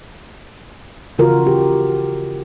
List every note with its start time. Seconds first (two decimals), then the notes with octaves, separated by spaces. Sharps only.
1.18 C#3 E3 F4 F#4 A#4
1.47 G4